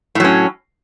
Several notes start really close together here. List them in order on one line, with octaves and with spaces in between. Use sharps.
A2 F#3 C#4